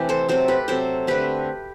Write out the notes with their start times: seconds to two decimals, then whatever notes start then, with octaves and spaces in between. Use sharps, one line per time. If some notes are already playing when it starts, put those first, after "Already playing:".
Already playing: C3 E3 A3 E4 G4
0.09 A4 C5
0.29 C3 F#3 C4 A4 C5
0.48 G4 B4
0.68 C3 F#3 C4 A4 C5
1.07 D3 A3 C4 G4 B4